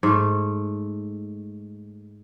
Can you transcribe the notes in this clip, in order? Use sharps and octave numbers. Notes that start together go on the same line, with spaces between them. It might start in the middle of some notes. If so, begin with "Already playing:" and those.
G#2 A3